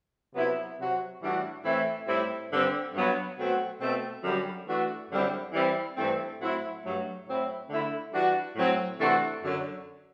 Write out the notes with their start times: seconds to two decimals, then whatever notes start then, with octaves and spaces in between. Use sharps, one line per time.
0.34 C3 F#3 B3 E4
0.78 C3 F#3 C4 F#4
1.22 A2 E3 G3 D4 F#4
1.65 A2 E3 A3 C4 E4
2.07 A2 G3 C4 E4
2.51 G2 D3 G3 C4
2.94 G2 F#3 B3
3.37 B2 F#3 A3 C4 F#4
3.81 B2 A3 C4
4.24 F#2 D3 G3
4.67 E3 A3 D4 F#4
5.10 F#2 D3 G3 C4 E4
5.53 E3 G3 C4 E4
5.96 G2 E3 A3 C4
6.40 A2 F#3 C4 E4
6.84 G2 F#3 A3
7.26 A2 F#3 C4 E4
7.70 D3 A3 E4
8.13 E3 G3 D4 F#4
8.56 A2 F#3 C4
8.99 C3 E3 A3 D4 F#4
9.42 F#2 D3 F#3